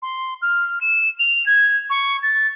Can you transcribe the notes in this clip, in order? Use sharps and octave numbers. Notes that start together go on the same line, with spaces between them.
C6
F6
E7
F7
G#6
C#6
A6